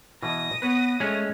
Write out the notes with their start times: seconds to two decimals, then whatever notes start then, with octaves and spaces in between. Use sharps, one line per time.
0.23 B2 E3 B3 D#6 A#6
0.62 B3 B4 C#5
1.00 G#3 A3 C#4